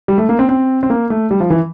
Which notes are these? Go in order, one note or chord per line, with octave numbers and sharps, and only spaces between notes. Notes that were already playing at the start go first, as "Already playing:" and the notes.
G3
A3
A#3
C4
C4
C4
A#3
A3
G3
F3
E3